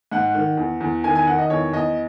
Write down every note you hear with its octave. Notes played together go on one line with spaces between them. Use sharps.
G#2 F#5
D#3
E2
E2
D#3 G#5
G#5
D#3 F#5
D#5
E2 C#5
E2 D#5